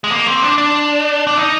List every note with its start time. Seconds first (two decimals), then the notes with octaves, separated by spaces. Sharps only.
0.04 G#3
0.10 A#3
0.27 C4
0.43 D4
0.58 D4
1.27 D4
1.37 D#4